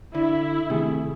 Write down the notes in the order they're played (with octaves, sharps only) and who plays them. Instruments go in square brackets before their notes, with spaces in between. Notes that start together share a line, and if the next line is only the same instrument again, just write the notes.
[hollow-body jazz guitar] D3 [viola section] E4
[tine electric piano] C3 A3 G#4 [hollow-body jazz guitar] D#3